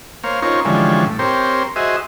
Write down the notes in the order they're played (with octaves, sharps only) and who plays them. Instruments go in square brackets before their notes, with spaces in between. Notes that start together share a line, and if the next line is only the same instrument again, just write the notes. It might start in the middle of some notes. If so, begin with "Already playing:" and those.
[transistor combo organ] A#3 C5 C#5 F5
C#4 D#4 F4 A#4 C5 C#5
D3 E3 F3 G3 G#3 C#4
A2
C4 G4 A#4 C5 C#5
F#4 G#4 C5 D#5 E5